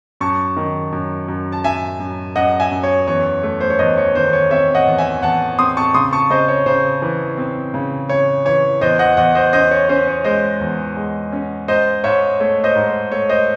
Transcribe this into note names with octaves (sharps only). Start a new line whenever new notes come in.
F#2 A5 C#6
D#3
F#2
F#2
A5
F#2 E5 G#5
F#2
F#2 D#5 F#5
E5 G#5
F#2
C#5
E2 C#5
A3
C5
C#5
E2 C5 D#5
C#5
D#3 C5
C#5
C4 C#5 E5
D#5 F#5
E2
E5 G#5
E2 F#5 A5
C4 C6 D#6
A5 C#6
C#3 C6 D#6
A5 C#6
C#3 C5 D#5
C#5
C#3 C5
E3
C4
C#3
C#3 C#5
E3 C#5
E2 C5 D#5
D#5 F#5
E2 D#5 F#5
C5 D#5
C#4 C5 D#5
C#5
C#4 C5
C#5
G#3 C5 D#5
E2
G#3
C#4
G#2 C5 D#5
G#2 C#5 E5
A3 C#5
C5 D#5
G#2
C5
A3 C#5
C5 D#5